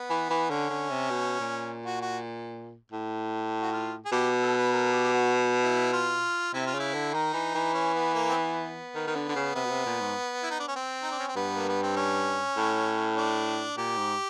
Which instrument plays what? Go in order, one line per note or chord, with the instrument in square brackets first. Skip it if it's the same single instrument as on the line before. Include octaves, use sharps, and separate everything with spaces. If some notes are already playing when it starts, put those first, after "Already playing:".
Already playing: [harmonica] B3
[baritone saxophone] E3
E3
[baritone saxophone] D3 [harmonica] C#4
[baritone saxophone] D3
C3
B2
A#2
[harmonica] F#4
F#4
[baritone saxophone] A2
[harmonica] F#4
F4
G#4
[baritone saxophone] B2 [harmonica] G4
[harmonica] A4
B4
A#4
G4
G4
F#4
E4
F4
[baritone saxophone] C3 [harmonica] E4
[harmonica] F4
[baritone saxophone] C#3
[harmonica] E4
[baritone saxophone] D3
[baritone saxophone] D#3 [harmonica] D#4
[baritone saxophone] E3
E3
[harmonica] C#4
B3
A#3
C4
B3
[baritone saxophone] D#3
D#3
D3
D3
C#3
[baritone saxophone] C3 [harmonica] B3
[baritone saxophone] B2
C3
A#2
G#2
[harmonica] E4
D#4
D4
C#4
C4
D#4
D4
C#4
C4
[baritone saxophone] G2 [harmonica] B3
[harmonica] A#3
B3
C4
C#4
[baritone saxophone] A2
[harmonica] D4
[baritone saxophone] A#2 [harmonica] G4
[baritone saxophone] G#2